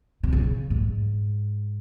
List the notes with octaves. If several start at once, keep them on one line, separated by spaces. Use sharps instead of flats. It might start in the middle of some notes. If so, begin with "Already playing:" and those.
C3
C#3
G#2